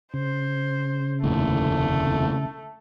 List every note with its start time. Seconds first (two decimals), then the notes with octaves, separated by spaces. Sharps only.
0.14 C#3 C5
1.23 F1 D#2 A2 A3